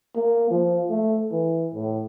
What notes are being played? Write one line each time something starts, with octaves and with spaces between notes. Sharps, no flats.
A#3
F3
A3
E3
A2